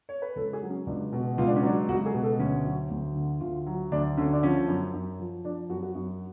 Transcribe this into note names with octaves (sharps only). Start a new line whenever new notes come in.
C#5
B4
C#2 A4
G#4
F#3
C#4
C#2 D4
B2
C#2 F4
D4
C#4
F#3 D4
C#2 F#4
G#4
B2
A4
D2 C#4
F#3
D2
D3
D2 F4
F#3
D2 D4
D3 C#4
D4
F3 C#4
F#2
F#2
F3
F3 D4
F#2 F#4
F#4
F#2